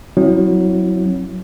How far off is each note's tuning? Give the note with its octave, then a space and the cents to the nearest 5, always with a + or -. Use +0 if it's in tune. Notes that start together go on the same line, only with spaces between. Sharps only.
F#3 +0 C4 +30 E4 -10